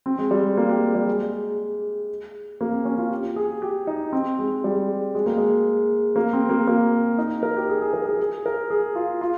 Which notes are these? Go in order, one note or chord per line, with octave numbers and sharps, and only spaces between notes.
C4
G#3
G3
A#3
G4
G3
G#3
A#3
C4
C#4
F4
G4
G#4
G4
D#4
C4
G#3
G3
G#3
A#3
G#3
A#3
C4
A#3
A#3
D#4
A#4
G4
G#4
G#4
A#4
G#4
G#4
A#4
G#4
F4
F4